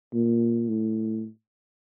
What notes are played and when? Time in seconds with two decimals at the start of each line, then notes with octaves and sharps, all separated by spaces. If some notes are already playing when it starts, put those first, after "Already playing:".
0.14 A#2
0.68 A2